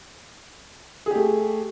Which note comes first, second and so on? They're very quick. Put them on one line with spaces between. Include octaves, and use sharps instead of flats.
G#4 G4 A3